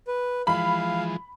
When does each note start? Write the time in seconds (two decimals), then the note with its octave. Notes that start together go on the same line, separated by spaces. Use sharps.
0.08 B4
0.47 E3 F3 G#3 F5 B5